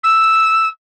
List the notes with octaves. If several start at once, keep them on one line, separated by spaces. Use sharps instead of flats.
E6